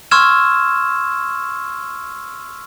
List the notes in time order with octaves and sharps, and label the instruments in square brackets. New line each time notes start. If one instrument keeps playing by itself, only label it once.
[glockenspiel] C6 C#6 E6 F6 G#6 E7